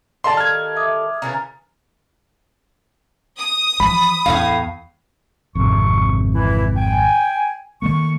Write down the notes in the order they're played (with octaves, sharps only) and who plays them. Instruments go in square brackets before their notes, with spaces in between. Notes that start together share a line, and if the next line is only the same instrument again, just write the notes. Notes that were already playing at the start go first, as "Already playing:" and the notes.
[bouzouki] D#3 G3 A4 [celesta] F5 [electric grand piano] A5 C6
[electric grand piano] F6 G#6
[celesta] E5 D6 D#6
[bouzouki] C#3 E3 A#4 [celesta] A#5 A6
[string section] D#6
[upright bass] E3 F3 [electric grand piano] B5
[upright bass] E2 [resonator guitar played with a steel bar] A2 C#4 F5
[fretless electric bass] G#1 F2 C3 [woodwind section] C#6
[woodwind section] E3 E4
G5 G#5
[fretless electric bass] D#3 A3 A#3 [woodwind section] C#6